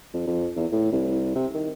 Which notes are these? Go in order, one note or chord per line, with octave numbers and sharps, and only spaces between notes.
F2
F2
E2
A2
C2
C3
D#3